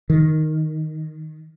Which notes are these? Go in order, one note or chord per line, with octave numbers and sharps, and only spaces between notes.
D#3